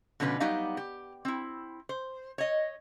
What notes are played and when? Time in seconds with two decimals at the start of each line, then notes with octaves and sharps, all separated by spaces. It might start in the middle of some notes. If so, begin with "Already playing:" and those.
0.20 B2 D3 F3 C#4 D#4 B4
0.40 F#3 G3 B3 D#4 G4 F5
0.77 G4
1.25 C4 E4
1.89 C5
2.38 C#5 D#5